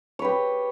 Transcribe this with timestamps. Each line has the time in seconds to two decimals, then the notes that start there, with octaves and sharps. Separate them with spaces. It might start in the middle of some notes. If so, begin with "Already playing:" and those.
0.19 C#5
0.22 B4
0.24 G4